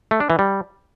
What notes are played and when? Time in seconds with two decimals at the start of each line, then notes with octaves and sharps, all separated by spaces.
0.11 A3
0.20 D4
0.30 E3
0.39 G3